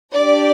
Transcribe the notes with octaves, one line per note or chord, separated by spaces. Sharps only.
D4 G4 D5